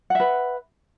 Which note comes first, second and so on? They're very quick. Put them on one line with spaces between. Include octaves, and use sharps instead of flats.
F#5 E5 B4